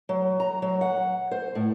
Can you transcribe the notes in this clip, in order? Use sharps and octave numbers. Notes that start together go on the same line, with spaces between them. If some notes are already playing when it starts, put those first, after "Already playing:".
F#3
A#5
F#3
F#5
C5
A2